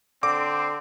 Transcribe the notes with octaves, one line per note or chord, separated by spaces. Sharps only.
D3 C4 D6